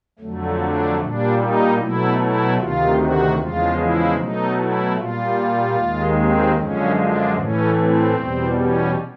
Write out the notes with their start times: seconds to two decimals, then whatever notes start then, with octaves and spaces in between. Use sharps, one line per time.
0.19 F2 D3 F#3 A3
0.59 D4
0.99 A#2 G3 D4
1.38 D#4
1.78 B2 F#3 A3 E4
2.18 E4
2.57 D2 C3 D#3 F4
2.97 F#4
3.37 E2 C#3 F3 G#3 F4
3.78 E4
4.17 B2 F#3 A3 D#4
4.57 E4
4.96 A#2 G3 F4
5.77 D#2 D#3 G#3
6.16 C4
6.55 F#2 D3 F3 G#3 C#4
6.96 D4
7.35 A2 E3 A3 C#4
7.76 C4
8.16 E2 B2 G3
8.55 C#4